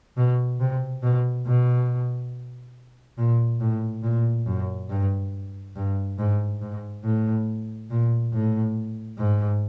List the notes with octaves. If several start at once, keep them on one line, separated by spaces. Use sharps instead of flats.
B2
C3
B2
B2
A#2
A2
A#2
F#2
G2
G2
G#2
G#2
A2
A#2
A2
G#2